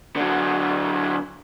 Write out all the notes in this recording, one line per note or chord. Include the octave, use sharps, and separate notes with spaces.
D3 F#3